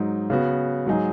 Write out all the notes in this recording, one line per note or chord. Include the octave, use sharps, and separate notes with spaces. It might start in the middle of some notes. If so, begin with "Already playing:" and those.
Already playing: G#2 F#3 D#4
C#3 B3 F#4
G#2 F#3 D#4 G#4